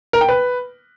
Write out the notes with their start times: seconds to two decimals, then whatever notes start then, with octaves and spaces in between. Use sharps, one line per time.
0.13 A#4
0.21 G5
0.29 B4